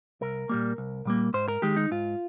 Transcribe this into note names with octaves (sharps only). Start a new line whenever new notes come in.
C2 A#4
A#2 G3 A#3
C2
A#2 G3 A#3
G#2 C5
A#4
D#3 G#3 G4
D#4
G#2 F4